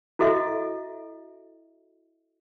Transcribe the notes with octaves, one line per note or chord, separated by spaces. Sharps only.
E4 F#4 A4 D#5 E5